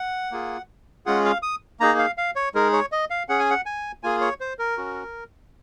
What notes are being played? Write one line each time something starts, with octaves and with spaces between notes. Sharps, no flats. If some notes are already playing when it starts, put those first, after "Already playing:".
Already playing: F#5
A#3 F4 G#4
G#3 C#4 F4 G#4 F#5
F5
D#6
A#3 D#4 G#4 A#5
F5
F5
C#5
G#3 D#4 G#4 A#4
C#5
D#5
F5
C#4 G#4 F#5
G#5
F#5
G#5
A#3 F4 G#4 G#5
C#5
C5
A#4
C#4 F#4